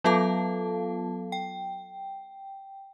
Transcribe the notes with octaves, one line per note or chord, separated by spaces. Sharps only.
F#3 B3 F4 A4 F5 A5
G5